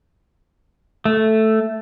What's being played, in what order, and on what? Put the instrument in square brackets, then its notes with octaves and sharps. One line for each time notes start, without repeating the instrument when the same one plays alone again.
[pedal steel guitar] A3